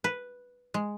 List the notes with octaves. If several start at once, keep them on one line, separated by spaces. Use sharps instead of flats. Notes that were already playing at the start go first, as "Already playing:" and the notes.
B4
G#3